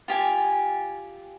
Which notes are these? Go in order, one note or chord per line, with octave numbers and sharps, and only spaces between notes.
F4 G4 G#5